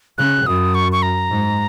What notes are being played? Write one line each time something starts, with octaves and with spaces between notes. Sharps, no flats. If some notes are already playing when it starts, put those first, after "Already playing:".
C#3 F#6
F#2 D#6
C#6
C#6
A#5
G#2